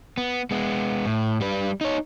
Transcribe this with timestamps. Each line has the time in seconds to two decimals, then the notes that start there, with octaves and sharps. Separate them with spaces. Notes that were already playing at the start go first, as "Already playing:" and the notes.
0.18 B3
0.51 G#3 B3
1.06 A2
1.41 G3 B4
1.81 D#4 C#5